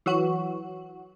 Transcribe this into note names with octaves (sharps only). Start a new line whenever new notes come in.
E3 F#3 F#4